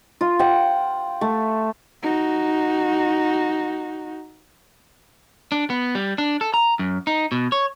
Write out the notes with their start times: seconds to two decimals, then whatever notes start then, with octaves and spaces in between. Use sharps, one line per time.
0.21 F4
0.39 F#5 G5
1.21 A3
2.03 D#4 F#4
5.52 D4
5.70 B3
5.95 G3
6.18 D4
6.41 A4
6.54 A#5
6.79 F#2
7.07 D#4
7.32 B2
7.52 C#5